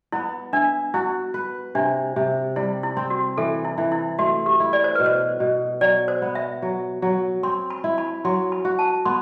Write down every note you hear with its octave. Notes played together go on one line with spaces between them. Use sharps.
B3 E4
D4 E5
E4 F#4
B4
C3 D4
C3
G3 E4
E4
C4
F#4
E3 A4
E4
E3
E4
A3 F#4
G4
E4
D5
C5
B2 B4
C5
B2
F#3 D5
C5
B3
E5
F#3
F#3
C4 C6
B5
E4
B5
F#3 C6
B5
F#4
A5
B3 C6